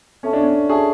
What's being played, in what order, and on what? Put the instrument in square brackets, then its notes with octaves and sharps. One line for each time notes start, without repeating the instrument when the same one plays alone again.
[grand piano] C#4 [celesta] A4 E5 A5 C#6
[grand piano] D4
C#4
[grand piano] G#4 [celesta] A4 E5 A5 C#6